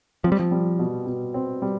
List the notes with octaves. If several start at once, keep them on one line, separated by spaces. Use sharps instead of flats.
F3 C4
G3
F3
G3
B2
B2
C4
G3